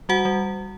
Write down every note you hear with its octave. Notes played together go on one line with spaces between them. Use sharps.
G3 F#4 F#5
G3